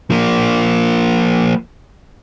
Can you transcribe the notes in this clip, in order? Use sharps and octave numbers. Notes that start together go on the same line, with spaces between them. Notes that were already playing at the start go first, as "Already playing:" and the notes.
F3 A#3